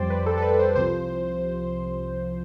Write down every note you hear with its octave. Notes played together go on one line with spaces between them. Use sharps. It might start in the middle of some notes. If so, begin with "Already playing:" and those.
Already playing: F2 G3 C5 D5 G5
B4
A4
A4
B4
C5
C2 C3 F3 C5